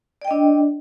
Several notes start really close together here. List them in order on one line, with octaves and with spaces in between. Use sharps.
D5 G5 D#5 D4